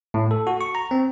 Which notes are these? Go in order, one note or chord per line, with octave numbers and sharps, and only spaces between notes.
A2
A4
F#4
C#6
A#5
C4